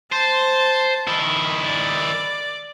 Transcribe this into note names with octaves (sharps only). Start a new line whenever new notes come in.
C5 A5
D#3 E4
D5